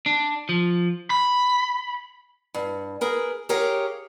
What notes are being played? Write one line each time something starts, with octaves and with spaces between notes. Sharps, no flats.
D4
F3
B5
G2
G#4 A#4 B4
G4 G#4 A#4 C#5 F5 G5